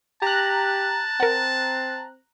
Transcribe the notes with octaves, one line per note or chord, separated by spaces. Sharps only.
G4 A5 A#5 F#6
C4 A#4 F#5